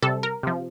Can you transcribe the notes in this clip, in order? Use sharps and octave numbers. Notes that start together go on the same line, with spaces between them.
C3 G3 A4
A#4
C3 F3